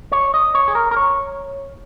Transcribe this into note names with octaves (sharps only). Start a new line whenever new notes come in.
C#5
D#5
C#5
G#4
A#4
A#4
C#5